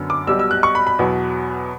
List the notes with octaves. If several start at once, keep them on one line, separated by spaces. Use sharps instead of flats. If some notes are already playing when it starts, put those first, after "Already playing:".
Already playing: F#2 D3 B3
D6
B1 B2 G3 E6
E6
F#6
C#6
B5
B5
E2 B2 F#3